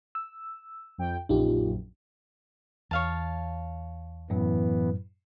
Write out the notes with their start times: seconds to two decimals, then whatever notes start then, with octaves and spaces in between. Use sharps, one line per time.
0.15 E6
0.98 F2 G5
1.29 A#1 F#2 D#4 F4 G4
2.91 E2 C#5 F5 A5
4.30 F#2 A2 E3 F#3 B3